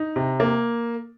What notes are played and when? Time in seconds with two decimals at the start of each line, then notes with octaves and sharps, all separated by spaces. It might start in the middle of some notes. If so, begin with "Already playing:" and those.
Already playing: D#4
0.16 C3
0.40 A#3